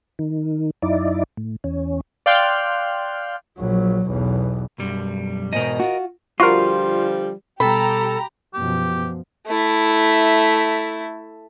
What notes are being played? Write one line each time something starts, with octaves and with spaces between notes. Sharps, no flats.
D#3
F#2 D#4 E4 D5
A2
E2 C#4
D5 F5 G5 C6 F6 F#6
A#1 F#3
B1 E2
B1 F#2 G3
E2 G#2 B2 A#4 D#5
F4 F#4
D3 F3 G3 F4 F#4 A#4
B2 G3 G4 A4 A#5 B5
F#2 B2 F3 G4
A3 E4